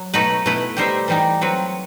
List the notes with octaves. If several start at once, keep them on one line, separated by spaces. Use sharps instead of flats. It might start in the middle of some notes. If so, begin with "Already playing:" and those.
Already playing: F#3
B2 A3 D#4 F#4 B4
B2 A3 E4 B4
G3 D#4 G4 C5 E5
E3 G3 D#4 G4
F#3 C4 F#4 B4